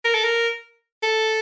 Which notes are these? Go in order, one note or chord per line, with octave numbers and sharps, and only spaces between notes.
A#4
A4
A#4
A4